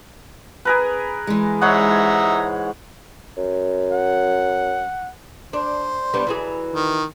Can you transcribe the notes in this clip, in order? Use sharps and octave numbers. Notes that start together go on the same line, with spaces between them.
G#4 A#4 B4
E3 G#3
G#2 C#5 E5 F#5 A#5 D#6
F#2
F#5
D4 C5
G3 B3 D4
E3 F#3 G#4
D#3